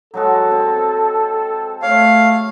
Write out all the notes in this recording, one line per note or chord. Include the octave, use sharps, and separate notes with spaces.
F#3 G#3 F#4 A4
C4
A3 C#5 F5